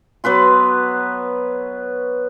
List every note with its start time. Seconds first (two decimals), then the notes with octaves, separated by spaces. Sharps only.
0.24 F#3 B3 B4 C6